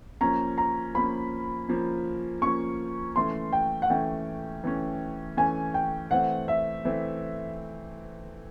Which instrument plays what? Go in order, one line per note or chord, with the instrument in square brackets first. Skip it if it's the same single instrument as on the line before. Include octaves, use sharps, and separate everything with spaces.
[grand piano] F3 A#3 C#4 [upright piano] A#5
[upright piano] A#5
[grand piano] F3 A#3 C#4 [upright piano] B5
[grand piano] F3 A#3 C#4
[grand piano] F3 A#3 C#4 [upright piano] C#6
[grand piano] E3 A3 C#4 [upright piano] C6
[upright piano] G5
F#5
[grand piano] E3 A3 C#4 [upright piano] G5
[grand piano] E3 A3 C#4
[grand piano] E3 A3 C#4 [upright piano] G#5
[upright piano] G5
[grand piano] E3 A3 C4 [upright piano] F#5
[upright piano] E5
[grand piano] E3 A3 C4